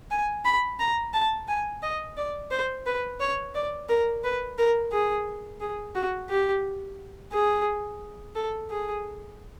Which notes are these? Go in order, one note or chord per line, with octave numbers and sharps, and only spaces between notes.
G#5
B5
A#5
A5
G#5
D#5
D5
C5
B4
C#5
D5
A#4
B4
A#4
G#4
G#4
F#4
G4
G#4
A4
G#4